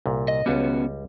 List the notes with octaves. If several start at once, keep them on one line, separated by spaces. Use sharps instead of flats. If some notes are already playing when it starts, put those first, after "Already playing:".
C2 A#2
D#5
C#2 G3 B3 C#4 F#4